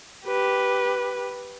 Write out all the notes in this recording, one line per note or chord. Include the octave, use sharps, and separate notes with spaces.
G4 B4